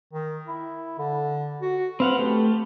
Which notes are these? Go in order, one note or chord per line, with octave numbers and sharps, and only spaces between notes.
D#3
E4
D3
F#4
C4 B4 F5 F#5
A3 G4